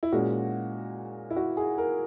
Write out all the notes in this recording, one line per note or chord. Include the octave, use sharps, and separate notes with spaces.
E4
A#2 G#3 C#4 F#4
E4
F#4
G#4
A#4